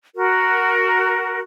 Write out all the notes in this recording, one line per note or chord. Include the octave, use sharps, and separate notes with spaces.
F#4 A#4